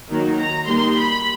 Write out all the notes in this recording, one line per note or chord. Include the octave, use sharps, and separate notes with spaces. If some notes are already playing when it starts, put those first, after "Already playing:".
D#3 F#3 A#3
A#5
D#3 G3 A#3 C6
B5